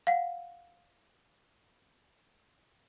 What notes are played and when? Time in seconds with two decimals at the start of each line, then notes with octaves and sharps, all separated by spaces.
0.07 F5 F#5